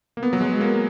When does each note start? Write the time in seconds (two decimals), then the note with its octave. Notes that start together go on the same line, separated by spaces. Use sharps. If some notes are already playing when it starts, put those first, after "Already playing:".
0.17 A#3
0.23 B3
0.33 F#3
0.41 G#3
0.61 A#3